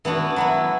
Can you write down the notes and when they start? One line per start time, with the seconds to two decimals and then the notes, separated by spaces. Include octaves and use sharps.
0.05 E3 B3 D4 F#4
0.36 F#3 B3 E4